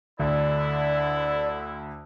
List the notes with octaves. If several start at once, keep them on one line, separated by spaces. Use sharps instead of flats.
D2 D3 E4 D5